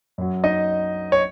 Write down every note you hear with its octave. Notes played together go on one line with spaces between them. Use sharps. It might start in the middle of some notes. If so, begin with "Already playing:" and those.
F#2 F#3
D#4 D#5
C#5